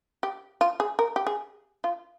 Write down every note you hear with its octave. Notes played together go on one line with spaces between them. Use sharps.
G4
F4
G#4
A#4
G4
G#4
F4